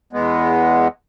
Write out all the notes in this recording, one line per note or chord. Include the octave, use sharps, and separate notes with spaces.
E2 G#3 B3